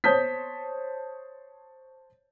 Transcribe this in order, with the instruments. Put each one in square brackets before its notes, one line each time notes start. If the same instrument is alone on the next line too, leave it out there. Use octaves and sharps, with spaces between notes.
[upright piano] C5 C#5 A5 D#6 G6 B6